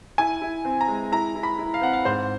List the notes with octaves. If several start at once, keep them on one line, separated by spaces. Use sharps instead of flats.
E4 G#5
E4
C4
A#5
G#3
E4 A#5
E4
B5
E4
F5
C4 F#5
F5
G#2 C5